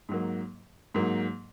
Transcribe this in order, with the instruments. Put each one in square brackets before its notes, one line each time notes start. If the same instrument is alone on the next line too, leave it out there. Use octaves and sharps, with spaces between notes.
[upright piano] G#2 F#3 A#3
G#2 F#3 A#3